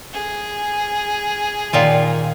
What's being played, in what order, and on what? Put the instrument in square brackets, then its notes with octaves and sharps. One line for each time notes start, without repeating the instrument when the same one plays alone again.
[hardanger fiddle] G#4
[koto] A#2 D#3 F4